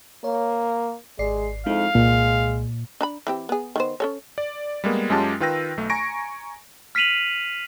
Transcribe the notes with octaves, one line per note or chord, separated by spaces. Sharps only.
A#3 C#5
G#1 G#3 D5 C7
F2 G#3 D#4 E4 F5
C2 A#2 G#3
D4 A#5 B5
E3 C4 G4
B3 G#4
D#3 B3 C5
C#4 A4 C#5
D5
G3 G#3 A#3 B3
F#2 G#3 C#4 F4 G4 A5
D#3 F4 B4 G5 E6 A#6
B1 A3
G#5 A#5 C#6 A#6 D7
F6 B6 C7 D#7 F7 F#7